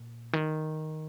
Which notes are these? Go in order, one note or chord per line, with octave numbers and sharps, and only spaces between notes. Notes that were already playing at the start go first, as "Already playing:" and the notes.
Already playing: A#2
D#3